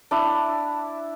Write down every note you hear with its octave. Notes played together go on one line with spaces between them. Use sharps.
D4 E4